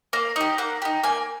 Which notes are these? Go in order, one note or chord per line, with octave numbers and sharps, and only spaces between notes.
A#3 F5
D#4 G4
A#3 F#5
D#4 G4
A#3 G#5